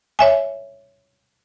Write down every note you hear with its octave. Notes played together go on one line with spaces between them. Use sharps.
C#5 E5 G#5